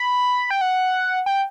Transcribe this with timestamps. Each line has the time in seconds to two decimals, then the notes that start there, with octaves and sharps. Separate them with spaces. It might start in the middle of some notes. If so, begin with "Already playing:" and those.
Already playing: B5
0.51 G5
0.61 F#5
1.26 G5